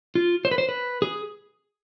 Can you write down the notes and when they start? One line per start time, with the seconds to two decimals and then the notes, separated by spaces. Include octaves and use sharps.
0.15 F4
0.45 C5
0.51 B4
0.58 C5
0.69 B4
1.02 G#4